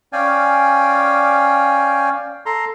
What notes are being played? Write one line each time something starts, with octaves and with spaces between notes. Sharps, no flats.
C#4 D5 F5 G5 G#5
A4 A#5 C6